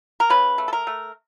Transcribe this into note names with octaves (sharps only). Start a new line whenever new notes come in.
A#4
C#3 B4
A3
A4
A#4
A3